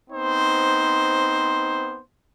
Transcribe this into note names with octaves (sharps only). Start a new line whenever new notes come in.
B3 C4 D#4 C5